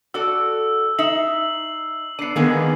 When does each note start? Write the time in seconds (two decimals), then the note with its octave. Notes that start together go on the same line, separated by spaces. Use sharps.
0.14 F#4 A4 D5 E6
0.99 D#4 E5 C7 F#7
2.19 B3 D4 C7 D#7
2.36 D3 D#3 G#3 A#3 B3 G#4